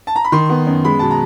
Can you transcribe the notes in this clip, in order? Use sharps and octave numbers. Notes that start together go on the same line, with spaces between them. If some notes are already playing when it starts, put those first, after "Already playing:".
A5
A#5
B5
D#3 C6
B3
F#2
G#3 B5
B2 A5
A#5